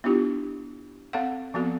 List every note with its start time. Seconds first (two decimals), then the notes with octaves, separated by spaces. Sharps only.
0.04 B3 D4 E4 F4 G4
1.13 C4 A4 F5 F#5
1.54 F3 B3 C4 F#4 A4